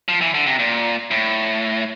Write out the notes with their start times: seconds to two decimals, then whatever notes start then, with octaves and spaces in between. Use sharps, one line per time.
0.08 F3
0.21 E3
0.34 D3
0.46 C3
0.59 A#2
1.11 A2